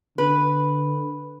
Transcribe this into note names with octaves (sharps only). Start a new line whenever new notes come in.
D3 B4